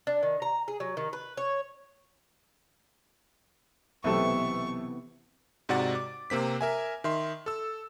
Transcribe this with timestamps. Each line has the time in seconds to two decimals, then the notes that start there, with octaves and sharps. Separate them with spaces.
0.07 D4
0.23 D#3
0.42 A#5
0.68 G#4
0.80 F#3
0.97 D#3
1.13 B4
1.37 C#5
4.04 B1 C3 E3 A3 B3 A4 C#6
5.69 G#2 C3 F#4 D5 F#5 A6
5.95 D6
6.30 C3 A#3 C4 B6
6.61 A#4 E5 G#5
7.04 D#3 E5 C6
7.46 A4 E6